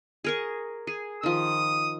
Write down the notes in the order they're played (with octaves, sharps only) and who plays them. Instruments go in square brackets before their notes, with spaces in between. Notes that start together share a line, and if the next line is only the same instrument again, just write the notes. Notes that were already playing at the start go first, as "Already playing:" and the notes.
[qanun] G#4 A#4 C#6
G#4
[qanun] D#3 F3 [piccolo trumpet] D#6